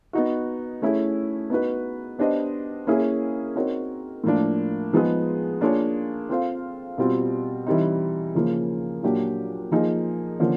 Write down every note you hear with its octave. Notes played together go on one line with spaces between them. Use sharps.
B3 D#4 F#4
A3 C#4 E4 G#4
B3 D#4 F#4 B4
B3 D4 G4 C5 D#5
A#3 C#4 E4 G#4
C4 D#4 F#4 A#4 C#5
A2 F3 A#3 D4
F3 G#3 B3 D#4 G#4
A#3 D4 F4 G#4 C#5
C4 F4 A4 C5 F5
B2 G3 C4 F4
E3 G3 C4 D#4
C#3 F3 A#3
A#2 F#3 A#3 D4 G4
F3 A#3 D#4 G#4
D3 F3 A#3 C#4